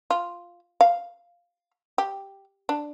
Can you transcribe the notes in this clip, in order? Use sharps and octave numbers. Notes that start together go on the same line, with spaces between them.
F4
F5
G4
D4